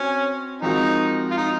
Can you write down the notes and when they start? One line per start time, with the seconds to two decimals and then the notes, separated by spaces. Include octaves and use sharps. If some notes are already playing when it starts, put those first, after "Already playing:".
Already playing: C4 C#4 F#4 C5
0.62 F3 G#3 C4 D#4 F#4 A#4
1.31 F4
1.37 D#4